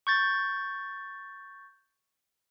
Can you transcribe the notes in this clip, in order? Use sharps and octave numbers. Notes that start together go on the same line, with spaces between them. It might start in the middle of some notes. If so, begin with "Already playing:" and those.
C#6 G6 A6